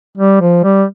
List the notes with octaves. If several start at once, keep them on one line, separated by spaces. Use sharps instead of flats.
G3
F3
G3